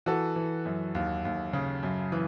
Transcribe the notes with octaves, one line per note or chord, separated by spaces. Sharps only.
E3 F#4 A4
E3
F#2
D#2
D#2
C#3
F#2
E3